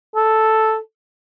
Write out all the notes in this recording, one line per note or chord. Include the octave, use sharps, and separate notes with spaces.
A4